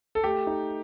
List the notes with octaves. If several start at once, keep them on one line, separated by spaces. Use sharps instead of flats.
A4
A3 G4
D#4